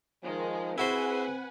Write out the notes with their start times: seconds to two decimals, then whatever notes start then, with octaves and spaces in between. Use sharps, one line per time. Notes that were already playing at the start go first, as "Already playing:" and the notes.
0.23 D#3 F3 G#3
0.78 C4 E4 F#4 G#4 B4 C5 F#5 G#5